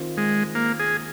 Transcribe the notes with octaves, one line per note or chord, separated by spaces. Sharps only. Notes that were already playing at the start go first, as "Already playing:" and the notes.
Already playing: D#3 C4 F4
G#3
A#3
G#4